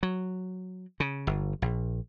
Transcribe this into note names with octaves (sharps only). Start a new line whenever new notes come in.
F#3
C#3
G1
A#1